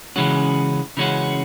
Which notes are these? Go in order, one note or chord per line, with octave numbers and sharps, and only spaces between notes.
C#3 E3 G#3 C#4 F#4
C#3 E3 G#3 C#4 F#4